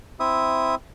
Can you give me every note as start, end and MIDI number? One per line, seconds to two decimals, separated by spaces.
0.20 0.75 60
0.20 0.75 64
0.20 0.75 76
0.20 0.75 87